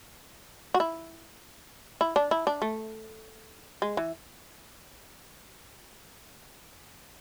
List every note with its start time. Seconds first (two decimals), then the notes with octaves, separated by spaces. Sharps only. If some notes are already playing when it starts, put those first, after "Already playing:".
0.74 F#4
0.80 E4
2.01 E4
2.16 D4
2.31 E4
2.47 D4
2.62 A3
3.82 G#3
3.97 E3